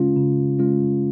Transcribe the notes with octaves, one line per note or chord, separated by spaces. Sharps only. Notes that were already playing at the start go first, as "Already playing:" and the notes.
Already playing: C#3 G#3 C#4 F4
C#3
G#3 C#4 F4